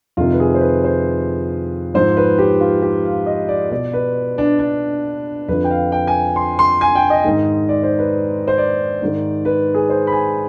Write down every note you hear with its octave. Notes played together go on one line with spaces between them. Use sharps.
F2 C3 D#3 F4
B4
G#4
C5
B4
C5
G#2 F3 C5
B4
G4
F4
G4
F5
D#5
D5
B2 D5
B4
D4
D4
F2 D3 F3 B4
G5
F5
G5
G#5
C6
C6
G#5
G5
D#5
G#2 D#3
D5
C5
B4
C5
D5
G#2 D#3
B4
G#4
C5
B5
G#5